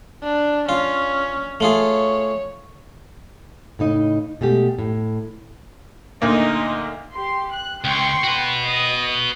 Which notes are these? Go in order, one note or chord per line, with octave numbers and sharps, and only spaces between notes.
D4
C#4 F4
A3 F4 G#4 C#5
A2 C#3 D#4 D#5
B2 G#3 A3 G4
A2
D2 A#2 A#3 D#4 A#4 D#5
G4 C6
F#6
C#2 G5 C6 C#6
F#4 B4
D#5 D#6